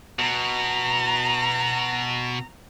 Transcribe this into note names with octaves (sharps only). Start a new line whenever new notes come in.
B2 A#5